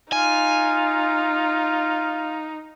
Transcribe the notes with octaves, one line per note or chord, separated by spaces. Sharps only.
D#4 F4 G#5